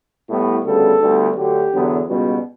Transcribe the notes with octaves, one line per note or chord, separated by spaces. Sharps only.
A2 G3 B3 E4
D2 C#3 G3 B3 A4
D2 D3 G3 B3
D2 D3 F#3 G4
E2 D3 F#3 B3
C#2 B2 G3 B3 F#4